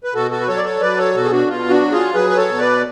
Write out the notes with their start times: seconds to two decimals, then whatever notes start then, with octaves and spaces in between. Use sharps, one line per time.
0.04 B4
0.14 B2 F#4 A4
0.31 F#4 A4
0.41 B4
0.48 F#3 A4 C#5
0.57 D5
0.64 A4 C#5
0.81 F#3 B4 D5
0.97 A4 C#5
1.14 B2 F#4 A4
1.24 G#4
1.31 D4 F#4
1.48 B2 F4
1.70 D4 F#4
1.81 F#3
1.92 F4 G#4
2.14 F#3 G#4 B4
2.30 B4
2.37 A4 C#5
2.49 B2
2.59 B4 D5